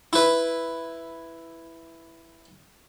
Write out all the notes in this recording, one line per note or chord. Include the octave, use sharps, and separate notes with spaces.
E4 B4